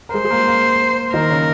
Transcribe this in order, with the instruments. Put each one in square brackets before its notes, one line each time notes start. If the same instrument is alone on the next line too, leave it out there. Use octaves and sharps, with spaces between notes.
[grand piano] A#4
[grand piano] G#3 G#4 [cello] C5
[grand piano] G#4
A#3 A#4
A#3 A#4
[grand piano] D#3 D#4 [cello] A#4
[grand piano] C#3 C#4